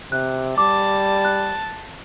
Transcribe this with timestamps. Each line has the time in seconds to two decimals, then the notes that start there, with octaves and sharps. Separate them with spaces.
0.12 C3 F#6
0.58 G3 A5 D6
1.25 F#6